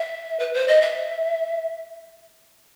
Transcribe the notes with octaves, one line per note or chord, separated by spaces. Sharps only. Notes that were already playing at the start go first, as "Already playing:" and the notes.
Already playing: E5
B4
C5
D#5
E5